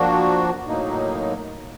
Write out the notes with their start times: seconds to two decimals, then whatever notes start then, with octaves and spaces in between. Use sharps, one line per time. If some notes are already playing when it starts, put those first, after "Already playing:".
Already playing: F3 A#3 D4 F#4
0.67 A2 F#3 A#3 D#4